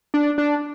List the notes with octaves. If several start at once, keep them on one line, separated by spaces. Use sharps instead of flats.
D4
D4